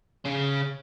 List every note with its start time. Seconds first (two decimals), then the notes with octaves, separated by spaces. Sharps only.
0.25 C#3 C#4